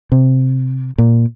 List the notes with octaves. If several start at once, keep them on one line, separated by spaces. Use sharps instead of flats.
C3
A#2